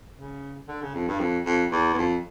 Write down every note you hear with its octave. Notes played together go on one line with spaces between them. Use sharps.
C#3
D3
C#3
F2
G2
F2
F2
E2
E2
F2